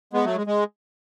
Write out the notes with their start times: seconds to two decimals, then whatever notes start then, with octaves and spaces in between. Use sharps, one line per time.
0.13 G#3 B3
0.25 F#3 A3
0.36 G#3
0.47 G#3